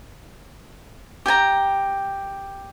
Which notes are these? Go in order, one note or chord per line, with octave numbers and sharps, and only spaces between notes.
G4 G5 G#5 A#5